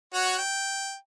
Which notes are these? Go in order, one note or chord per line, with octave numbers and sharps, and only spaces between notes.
F#4 C#5 F#5
G5